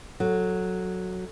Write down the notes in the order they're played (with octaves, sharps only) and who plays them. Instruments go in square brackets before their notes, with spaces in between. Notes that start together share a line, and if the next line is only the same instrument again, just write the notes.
[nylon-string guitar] F#3 [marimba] A4